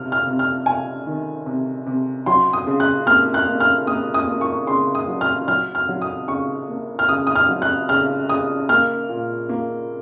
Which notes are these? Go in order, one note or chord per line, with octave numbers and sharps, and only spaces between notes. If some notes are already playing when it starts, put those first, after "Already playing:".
Already playing: C3 F6
F6
C3
F6
C3 G#5
D#3
C3
C3
F#3 C6
D#6
C#3
F#6
A#3 F6
F#6
A#3
F6
A#3 D#6
D#6
A#3
C#6
C#3 C6
D#6
F#3
F6
F#3 F6
F6
F#3
D#6
C#3 C#6
A#3
F6
C#3 D#6
D#6
F6
F#3
F#6
C#3 F6
C#3 D#6
A#3 F6
A#2
A#3